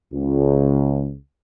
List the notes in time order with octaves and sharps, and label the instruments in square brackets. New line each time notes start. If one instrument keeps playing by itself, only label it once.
[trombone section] C#2